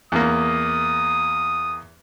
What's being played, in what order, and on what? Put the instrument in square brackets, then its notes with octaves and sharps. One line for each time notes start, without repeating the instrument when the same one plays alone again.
[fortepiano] E2 A#3 [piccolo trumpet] D#6